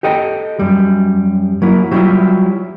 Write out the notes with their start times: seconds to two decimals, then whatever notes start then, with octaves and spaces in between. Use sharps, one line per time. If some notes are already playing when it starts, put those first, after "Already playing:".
0.03 G4 A4 D#5 G5
0.59 F#2 G3
1.62 F#3 A#3 E4
1.91 F#3 G3 C4 E4 F4 E5